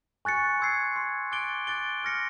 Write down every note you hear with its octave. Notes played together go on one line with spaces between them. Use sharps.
G#5 C#6 F#6 A6 C#7
C6 E6 G#6 C7
C6 E6 G#6 C7
D6 F#6 A6 D7 G7
D6 F#6 A6 D7 G7
C6 F6 A#6 C#7